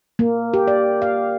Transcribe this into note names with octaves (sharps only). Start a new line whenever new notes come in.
A#3
G4
D5
F5